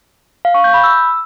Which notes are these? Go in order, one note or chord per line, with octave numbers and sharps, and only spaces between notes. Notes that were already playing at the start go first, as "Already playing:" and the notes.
F5
C#6
G6
B5
E6